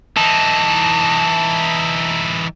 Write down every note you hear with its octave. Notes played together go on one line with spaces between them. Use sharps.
E3 D#4 A5